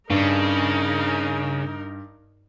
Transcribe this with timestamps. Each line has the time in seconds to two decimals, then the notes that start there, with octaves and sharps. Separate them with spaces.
0.10 G2 C#3 D#4 A#4